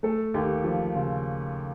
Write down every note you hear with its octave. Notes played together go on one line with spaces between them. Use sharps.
A3 A4
D#2 G4
F3
C#3 F4